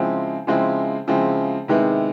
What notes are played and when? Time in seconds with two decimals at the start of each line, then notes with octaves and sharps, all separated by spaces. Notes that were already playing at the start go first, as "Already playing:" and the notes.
Already playing: C#3 F3 G#3 C4 E4
0.47 C#3 F3 G#3 C4 E4
1.08 C#3 F3 G#3 C4 E4
1.68 C3 D#3 G#3 B3 E4